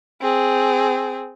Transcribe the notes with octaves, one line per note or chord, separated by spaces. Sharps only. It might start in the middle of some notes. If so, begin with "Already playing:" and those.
C4 G#4